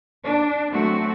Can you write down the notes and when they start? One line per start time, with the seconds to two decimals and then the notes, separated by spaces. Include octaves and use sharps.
0.23 D4
0.71 F#3 A3 C4 F#4